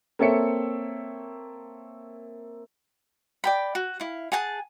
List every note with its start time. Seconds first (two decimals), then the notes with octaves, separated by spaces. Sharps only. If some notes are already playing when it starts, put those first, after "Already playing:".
0.19 A#3 C4 A4 C#5 E5 C#7
3.44 D5 G5 B5
3.75 F#4
4.00 E4 F5
4.32 G#4 F#5 G#5 A5